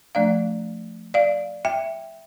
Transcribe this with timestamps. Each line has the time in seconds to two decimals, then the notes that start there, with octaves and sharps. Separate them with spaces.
0.15 F3 A3 D4 D5 F5
1.14 D5 F5
1.65 E5 G5